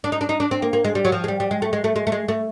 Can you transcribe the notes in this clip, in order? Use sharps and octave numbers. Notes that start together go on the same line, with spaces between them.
D4
D#4
D4
D#4
D4
C4
A#3
A#3
G#3
G3
F#3
F3
G#3
G3
G3
G#3
A3
G#3
A3
G#3
A3
G#3
A3